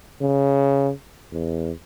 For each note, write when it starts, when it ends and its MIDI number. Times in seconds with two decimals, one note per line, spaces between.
0.21 0.91 49
1.33 1.71 40